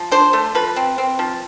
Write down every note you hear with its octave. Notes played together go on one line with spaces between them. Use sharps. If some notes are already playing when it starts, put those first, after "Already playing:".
Already playing: F3
D4 C5
A3
F3 B4
C4
C4
F3